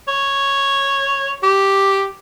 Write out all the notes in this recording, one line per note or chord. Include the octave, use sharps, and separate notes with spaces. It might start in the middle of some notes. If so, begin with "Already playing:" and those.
C#5
G4